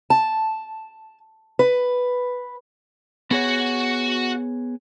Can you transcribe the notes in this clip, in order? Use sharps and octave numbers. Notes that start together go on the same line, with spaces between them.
A5
B4
B3 F#4 G#4 C#5 F#5